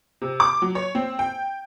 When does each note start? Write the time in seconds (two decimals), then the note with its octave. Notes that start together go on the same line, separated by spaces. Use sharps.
0.22 C3
0.40 D6
0.62 F#3
0.75 C#5
0.95 C4
1.19 G5